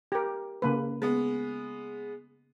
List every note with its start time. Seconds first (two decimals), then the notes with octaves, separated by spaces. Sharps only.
0.12 G4 A#4
0.62 C#3 A#3 B4
1.02 G#3 B3